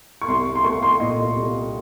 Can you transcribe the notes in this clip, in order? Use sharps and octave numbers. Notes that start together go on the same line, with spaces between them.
C#6
C2 C6
C6
A3 C#6
C6
A#2 D#5
C2